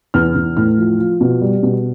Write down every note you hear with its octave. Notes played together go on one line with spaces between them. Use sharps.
E2 F6
E2
A2 F6
F3
F3
B2
G3
B2